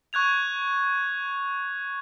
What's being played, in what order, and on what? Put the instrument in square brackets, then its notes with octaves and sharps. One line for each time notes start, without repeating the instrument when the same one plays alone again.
[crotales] C#6 F#6 G#6 F7